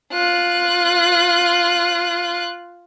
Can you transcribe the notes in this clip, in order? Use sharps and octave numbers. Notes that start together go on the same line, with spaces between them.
F4 F#6